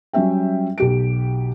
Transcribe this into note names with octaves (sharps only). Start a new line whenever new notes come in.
F#3 G3 C#4 E5 G5
B1 G4 D7